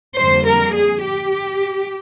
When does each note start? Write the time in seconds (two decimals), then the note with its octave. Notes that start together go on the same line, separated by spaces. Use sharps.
0.18 F2 D3 G3 A#3 C5
0.46 A#4
0.74 G#4
1.02 G4